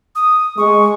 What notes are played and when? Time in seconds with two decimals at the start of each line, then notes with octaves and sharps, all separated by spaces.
0.16 D#6
0.58 G#3 C#6